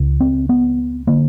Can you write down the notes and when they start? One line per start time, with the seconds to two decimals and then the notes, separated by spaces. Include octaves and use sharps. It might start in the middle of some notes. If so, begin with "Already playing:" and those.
Already playing: C#2 C#3
0.20 C4
0.49 B3
1.07 D3 A#3